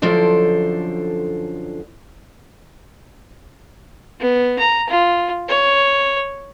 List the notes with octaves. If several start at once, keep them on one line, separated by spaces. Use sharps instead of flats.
F#2 D3 F3 A4 C5 D5
B3
A#5
F4
C#5